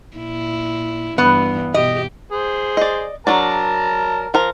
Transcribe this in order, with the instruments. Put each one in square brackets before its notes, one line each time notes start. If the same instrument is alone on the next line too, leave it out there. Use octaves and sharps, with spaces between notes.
[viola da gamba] A#2 E4
[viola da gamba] G2 E3 [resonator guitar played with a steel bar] B3
[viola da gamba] B2 G4 [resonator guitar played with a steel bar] D#5
[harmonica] G#4 C5
[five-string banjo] D5 D#5
[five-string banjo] F#3 D4 D5 [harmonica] A#4 A5 A#5
[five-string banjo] F3 A#4 A#5